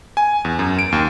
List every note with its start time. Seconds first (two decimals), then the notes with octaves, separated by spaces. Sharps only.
0.17 G#5
0.45 E2
0.59 F#2
0.79 D7
0.92 D#2